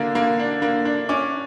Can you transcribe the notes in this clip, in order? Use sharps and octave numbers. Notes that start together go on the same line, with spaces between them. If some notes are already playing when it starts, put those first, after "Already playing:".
Already playing: D3 A#3 D4
A#3
D4
A#3
D4
C#4 D6